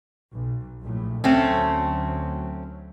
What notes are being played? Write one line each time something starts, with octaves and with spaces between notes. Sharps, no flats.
B1
A#1 A2
D2 F#3 A3 C4 C#4